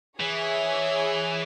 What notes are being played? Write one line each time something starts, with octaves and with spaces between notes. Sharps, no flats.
E3 G#4 C#5 E5 G#5